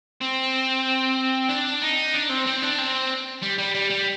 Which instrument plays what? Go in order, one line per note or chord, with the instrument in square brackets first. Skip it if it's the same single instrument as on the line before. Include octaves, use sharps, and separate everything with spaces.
[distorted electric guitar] C4
D4
D#4
D4
C4
C4
D4
C4
G3
G3
G3
G3